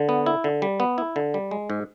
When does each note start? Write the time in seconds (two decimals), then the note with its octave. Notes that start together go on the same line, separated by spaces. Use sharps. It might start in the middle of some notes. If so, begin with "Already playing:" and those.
Already playing: D3
0.09 B3
0.26 E4
0.44 D3
0.62 G3
0.80 B3
0.98 E4
1.16 D3
1.34 G3
1.51 G#3
1.70 G#2